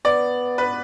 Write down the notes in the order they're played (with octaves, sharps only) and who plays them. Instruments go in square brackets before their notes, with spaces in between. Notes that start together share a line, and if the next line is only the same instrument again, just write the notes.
[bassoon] B3 [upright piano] D5
[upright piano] B4